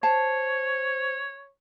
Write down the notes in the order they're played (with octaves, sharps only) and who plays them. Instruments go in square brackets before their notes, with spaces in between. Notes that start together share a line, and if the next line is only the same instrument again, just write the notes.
[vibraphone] C5 [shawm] C#5 [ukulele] A5